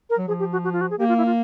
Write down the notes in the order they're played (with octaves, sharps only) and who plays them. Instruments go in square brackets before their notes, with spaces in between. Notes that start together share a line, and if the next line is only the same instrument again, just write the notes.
[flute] A#4
[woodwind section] F#3
[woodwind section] F3 [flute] G#4
[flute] G4
F#4
F#4
F4
F#4
G#4
[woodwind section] A#3 [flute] G4
[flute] F4
E4
F4